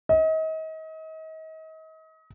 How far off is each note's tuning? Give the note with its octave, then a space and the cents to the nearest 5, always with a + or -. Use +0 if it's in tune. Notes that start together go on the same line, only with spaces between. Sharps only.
D#5 +35